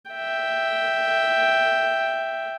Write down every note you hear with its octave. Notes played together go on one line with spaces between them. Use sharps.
E5 G5